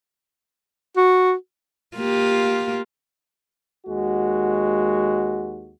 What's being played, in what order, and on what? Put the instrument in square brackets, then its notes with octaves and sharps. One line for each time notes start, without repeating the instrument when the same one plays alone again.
[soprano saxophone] F#4
[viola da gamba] A#3 F4 G4
[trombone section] D#2 G#3 F#4